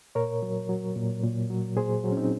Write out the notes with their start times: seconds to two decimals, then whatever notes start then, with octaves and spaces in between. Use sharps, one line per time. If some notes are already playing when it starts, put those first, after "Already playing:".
0.15 A#2 A#4 C#5
0.43 F#3
0.69 F#3
0.96 A#2
1.23 A#2
1.50 F#3
1.77 A#2 G#4 C5
2.04 F#3
2.12 C#4
2.17 C4 D#4